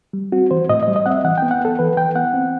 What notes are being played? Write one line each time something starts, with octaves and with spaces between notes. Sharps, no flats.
G3
C4 F#4
E3 C5
A2 D#5
D#5
G3
D#5
C4 E5 F#5
E3 F#5
G5
B3
F#5
B3 A4
E3 B4
E3 G5
B3 F#5
C4